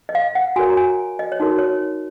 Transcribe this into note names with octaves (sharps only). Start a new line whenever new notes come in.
D#5
F5
F#5
F#4 A#4 C#5 G#5
A#5
G#5
D#5
C#5
D#4 F#4 A#4
C#5